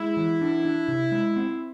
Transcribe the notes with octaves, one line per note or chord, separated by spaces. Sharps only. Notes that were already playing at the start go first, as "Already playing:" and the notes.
Already playing: G#3 E4
E3
D4
D4
C3
G#3
C4